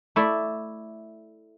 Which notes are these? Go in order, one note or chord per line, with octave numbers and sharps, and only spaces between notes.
A3 E4 D5